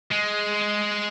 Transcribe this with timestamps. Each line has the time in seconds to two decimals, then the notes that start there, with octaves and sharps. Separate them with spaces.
0.11 G#3